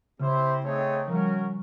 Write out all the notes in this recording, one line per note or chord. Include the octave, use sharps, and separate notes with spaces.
C#3 C4 E4 G4 C5
A3 C4 D#4 G#4 C#5
F3 G3 C#4 F#4 A#4